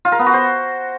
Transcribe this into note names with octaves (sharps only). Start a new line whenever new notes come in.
F4
A#4
B3
F#4
C5